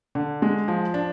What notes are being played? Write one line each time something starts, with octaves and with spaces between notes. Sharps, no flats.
D3
G#3
F3
D4